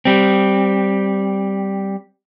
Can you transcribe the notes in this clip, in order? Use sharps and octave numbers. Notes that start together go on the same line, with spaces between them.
G3 C4